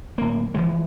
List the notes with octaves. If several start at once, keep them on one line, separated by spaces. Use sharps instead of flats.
D1 A#3
E3 F3 G#3